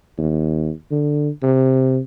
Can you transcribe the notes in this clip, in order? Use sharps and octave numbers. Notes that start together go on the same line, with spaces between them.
D#2
D3
C3